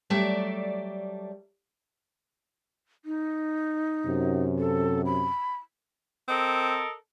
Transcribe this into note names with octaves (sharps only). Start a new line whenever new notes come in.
F#3 G3 A3 D5 E5 A5
D#4
F#2 C3
A4
B5
C4 A4 A#4 D#5